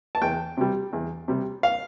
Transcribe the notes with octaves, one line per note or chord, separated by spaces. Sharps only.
A5
E2 G5
C3 G3
E2
C3 G3
F5